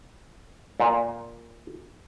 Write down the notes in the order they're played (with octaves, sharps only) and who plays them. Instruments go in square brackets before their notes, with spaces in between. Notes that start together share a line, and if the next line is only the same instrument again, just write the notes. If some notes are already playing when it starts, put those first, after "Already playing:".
[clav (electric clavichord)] A#2